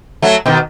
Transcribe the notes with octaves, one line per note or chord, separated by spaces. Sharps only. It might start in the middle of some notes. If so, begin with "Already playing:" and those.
F#3 A3
B2 D#3